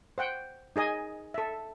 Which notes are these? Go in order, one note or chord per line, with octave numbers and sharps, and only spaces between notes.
C5 F#5 G5
D#4 G#4 D#5 G#5
A4 E5